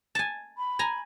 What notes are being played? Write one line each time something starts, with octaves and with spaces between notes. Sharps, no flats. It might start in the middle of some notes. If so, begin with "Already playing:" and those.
G#5 A5
B5
G#5 A#5